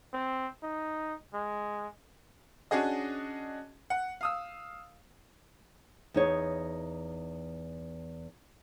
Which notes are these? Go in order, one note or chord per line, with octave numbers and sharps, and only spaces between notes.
C4
D#4
G#3
C#4 D4 F#4 G#4 D#5
F#5
F5 D#6 E6
E2 D#4 C#5